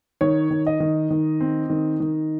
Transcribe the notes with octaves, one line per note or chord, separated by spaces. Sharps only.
D#3 C#5
D#3
D#5
D#3
D#3
C4
D#3
D#3